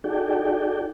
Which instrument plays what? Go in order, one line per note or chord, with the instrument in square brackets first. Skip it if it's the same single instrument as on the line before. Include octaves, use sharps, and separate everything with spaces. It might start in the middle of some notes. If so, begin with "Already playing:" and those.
[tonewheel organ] D#4 F#4 G#4 A4 D5 G5